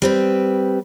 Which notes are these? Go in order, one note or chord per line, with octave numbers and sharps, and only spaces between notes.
G3 C4 B4